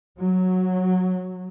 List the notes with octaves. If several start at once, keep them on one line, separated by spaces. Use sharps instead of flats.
F#3